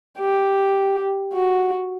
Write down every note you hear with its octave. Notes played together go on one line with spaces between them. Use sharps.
G4
F#4